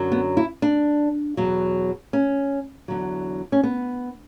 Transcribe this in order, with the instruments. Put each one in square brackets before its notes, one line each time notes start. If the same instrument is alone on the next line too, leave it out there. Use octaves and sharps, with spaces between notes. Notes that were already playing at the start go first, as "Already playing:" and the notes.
Already playing: [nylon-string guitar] F#2 D3 F#3
B3
E4
D4
E2 B2 F#3
C#4
E2 D3 F#3
C#4
B3